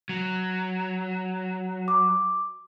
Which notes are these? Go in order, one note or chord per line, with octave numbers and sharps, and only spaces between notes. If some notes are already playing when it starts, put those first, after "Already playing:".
F#3
D6